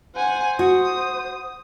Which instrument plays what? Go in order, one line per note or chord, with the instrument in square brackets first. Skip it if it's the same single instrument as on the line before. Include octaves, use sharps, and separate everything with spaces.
[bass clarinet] C5 [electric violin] F#5 G#5
[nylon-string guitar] F#4 [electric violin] D#6